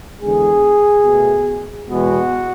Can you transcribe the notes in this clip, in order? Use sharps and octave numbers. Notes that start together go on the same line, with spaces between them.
E2 D3 G#3 G#4
B2 A3
E2 B2 G#3 B3 F#4